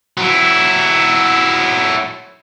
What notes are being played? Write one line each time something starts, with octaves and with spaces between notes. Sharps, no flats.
F#3 E4